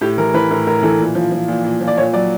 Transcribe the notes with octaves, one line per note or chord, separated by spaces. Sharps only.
A2 G4
E3 A#4
E3 B4
A2 A#4
A2 A#4
E3 A4
A#2
F3
F3
A#2
A#2
F3
D5
A#2 C#5
F#3 D5